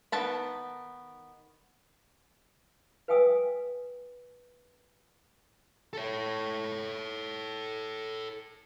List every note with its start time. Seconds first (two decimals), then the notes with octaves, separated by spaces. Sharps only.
0.12 D#3 B3 A5 B5
3.08 B4 F5 G5 G#5 D#6 E6
5.93 A4 C#5